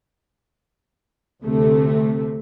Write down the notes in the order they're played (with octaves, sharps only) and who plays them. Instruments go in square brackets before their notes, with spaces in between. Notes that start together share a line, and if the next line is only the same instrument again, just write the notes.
[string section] D2 C3 A3